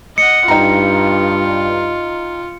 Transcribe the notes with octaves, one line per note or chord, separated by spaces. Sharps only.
D#5 F#5 C#7
G2 D#4 F4 G5 A#5